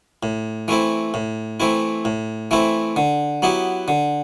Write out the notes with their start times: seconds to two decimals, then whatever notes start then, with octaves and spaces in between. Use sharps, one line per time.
0.23 A2
0.68 E3 A3 C4 E4
1.14 A2
1.60 E3 A3 C4 E4
2.05 A2
2.51 E3 A3 C4 E4
2.96 D3
3.42 F#3 B3 E4 G4
3.88 D3